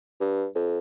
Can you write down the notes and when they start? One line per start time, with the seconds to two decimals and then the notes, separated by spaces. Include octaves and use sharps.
0.21 G2
0.55 F2